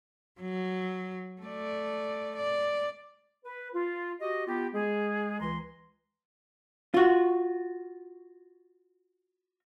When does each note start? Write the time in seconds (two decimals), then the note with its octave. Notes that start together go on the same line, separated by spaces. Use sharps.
0.41 F#3
1.42 A3 D5
2.36 D5
3.45 B4
3.74 F4
4.21 F#4 G4 D#5
4.47 B3 F4 G4
4.74 G#3 G#4
5.41 C#2 E3 A#5 C6
6.94 F4 F#4